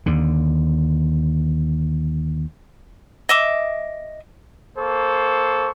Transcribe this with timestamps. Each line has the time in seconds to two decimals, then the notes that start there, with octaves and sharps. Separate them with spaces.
0.06 D#2 D3
3.29 D#5 E5 D6
4.77 A#3 A4 C5 C#6